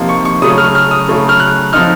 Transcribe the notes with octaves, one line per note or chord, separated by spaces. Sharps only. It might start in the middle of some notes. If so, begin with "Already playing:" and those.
Already playing: C3 F3 A#3 D#4
C#6
C#6
C#3 F#3 A3 C#4 D#6
F6
F6
D#6
C#3 F#3 A3 C#4
F6
F#6
F3 C4 D#4 F6